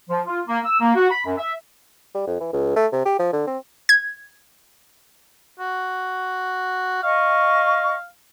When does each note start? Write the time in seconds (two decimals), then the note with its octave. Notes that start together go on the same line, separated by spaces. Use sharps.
0.10 F3
0.26 F4
0.48 A#3
0.65 E6
0.80 A#3
0.95 F#4
1.10 B5
1.26 F#2
1.38 E5
2.15 G3
2.27 F2
2.40 E3
2.53 C#2
2.76 A3
2.93 C3
3.06 G4
3.19 F3
3.33 D3
3.47 C4
3.89 G#6
5.60 F#4
7.03 D#5 F5 C#6